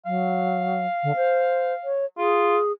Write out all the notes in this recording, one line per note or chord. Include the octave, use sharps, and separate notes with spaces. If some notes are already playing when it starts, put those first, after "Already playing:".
F#3 F5
D3
C5
C#5
F4 G#4